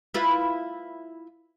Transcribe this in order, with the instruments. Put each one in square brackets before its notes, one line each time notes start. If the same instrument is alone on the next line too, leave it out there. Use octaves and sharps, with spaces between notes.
[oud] E4 F4 B4